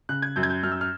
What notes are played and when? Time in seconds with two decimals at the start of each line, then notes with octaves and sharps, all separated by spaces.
0.09 C#3 F#6
0.22 G#6
0.36 F#2 G6
0.43 G#6
0.50 G6
0.63 F#2 F6
0.72 E6
0.81 F6